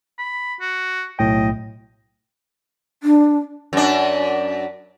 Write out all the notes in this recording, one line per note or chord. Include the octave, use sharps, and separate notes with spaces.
B5
F#4
B1 A2 D#5 G5
D4
F#2 D4